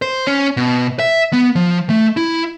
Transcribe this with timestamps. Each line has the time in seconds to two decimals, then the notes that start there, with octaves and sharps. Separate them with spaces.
0.02 C5
0.27 C#4
0.57 B2
0.99 E5
1.33 B3
1.56 F3
1.90 A3
2.17 E4